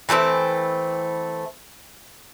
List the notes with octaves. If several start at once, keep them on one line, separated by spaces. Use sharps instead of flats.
E3 A3 B3 C4